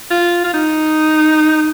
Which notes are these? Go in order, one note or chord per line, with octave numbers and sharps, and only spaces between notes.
F4
F4
D#4